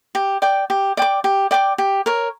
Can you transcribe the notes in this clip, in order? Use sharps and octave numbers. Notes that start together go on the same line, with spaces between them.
G4
D5 G5 D6
G4
D5 G5 D6
G4
D5 G5 D6
G4
A#4 C#5